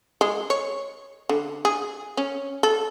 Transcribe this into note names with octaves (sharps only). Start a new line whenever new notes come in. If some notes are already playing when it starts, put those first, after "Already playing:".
G#3
C#5
D3
G#4
C#4
A4